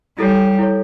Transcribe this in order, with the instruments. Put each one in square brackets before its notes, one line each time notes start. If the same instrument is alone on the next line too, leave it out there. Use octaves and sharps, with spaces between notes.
[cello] G3 [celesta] E4 A4 C#5
[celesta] E4 A4 C#5